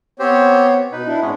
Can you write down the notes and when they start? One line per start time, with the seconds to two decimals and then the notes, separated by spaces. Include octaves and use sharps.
0.20 B3 C4 G4 C5 C#5
0.92 B2 D#4 B4
1.06 D4 E4
1.21 G#2 G#3 B3 C#4